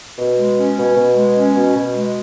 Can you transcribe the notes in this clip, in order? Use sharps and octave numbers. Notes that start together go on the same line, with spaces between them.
B2
G#3
C#4
B2
B2
G#3
C#4
B2
B2
G#3